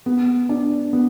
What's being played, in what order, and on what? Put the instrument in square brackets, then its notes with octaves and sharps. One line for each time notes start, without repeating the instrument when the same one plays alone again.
[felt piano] B3
D4
B3